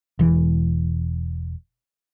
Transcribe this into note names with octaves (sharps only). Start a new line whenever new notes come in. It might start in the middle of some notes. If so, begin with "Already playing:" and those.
E1 E3